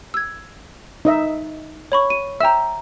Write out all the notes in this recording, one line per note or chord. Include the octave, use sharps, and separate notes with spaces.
E6 G#6
D#4 D#5 E5
C#5 B5 C#6
D#7
E5 G5 A#5 E6